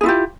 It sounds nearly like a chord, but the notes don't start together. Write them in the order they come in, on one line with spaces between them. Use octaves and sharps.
G#4 E4 F4 G4